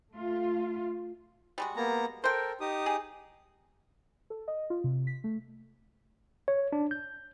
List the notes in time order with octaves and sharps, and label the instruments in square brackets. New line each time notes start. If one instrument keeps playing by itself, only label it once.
[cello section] A3 F4
[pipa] G3 G#3 F#4
[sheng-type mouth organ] A#3 B3 A#5
[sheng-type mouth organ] A4 A#4 [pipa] C5 G5
[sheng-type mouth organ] D#4 G4 D#6
[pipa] G#4
[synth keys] A4
D#5
F4
C3
B6
A3
[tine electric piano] C#5
D4
G6